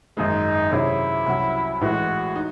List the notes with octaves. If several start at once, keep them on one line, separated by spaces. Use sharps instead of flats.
G#1 F#2 D#3 G#3 D#4
C3 D#3 F#3 C#4 E4 G#4
C2 C3 F#3 C#4 F#4
A1 A2 E3 G#3 F#4
D#4